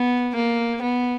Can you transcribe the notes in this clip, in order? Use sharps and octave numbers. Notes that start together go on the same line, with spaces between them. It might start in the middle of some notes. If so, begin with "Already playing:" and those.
Already playing: B3
A#3
B3